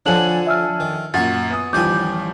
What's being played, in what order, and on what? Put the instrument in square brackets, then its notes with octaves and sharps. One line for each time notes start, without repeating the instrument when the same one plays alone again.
[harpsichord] D3 F3 [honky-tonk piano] D4 A4 G#5 [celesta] C#5 F#6 F#7
[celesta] E5 E6 F6
[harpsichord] D#3
[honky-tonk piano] F#2 A#2 [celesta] F#5 A6 [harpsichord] G#5 C#6
[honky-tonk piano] B3 D#6
[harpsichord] A1 D5 G#5 [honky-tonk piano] D#3 F3 G3 [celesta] D6 G6